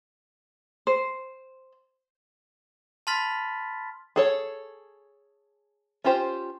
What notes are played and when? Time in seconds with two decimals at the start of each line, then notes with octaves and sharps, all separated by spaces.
0.87 C5
3.07 A5 B5 C6 F6 A6 B6
4.16 G#4 A4 C#5
6.04 C#4 F4 G4 C5